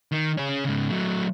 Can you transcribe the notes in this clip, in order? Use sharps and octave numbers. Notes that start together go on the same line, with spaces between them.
D#3
C#4 G#4
G#2 C#3
F#3 A3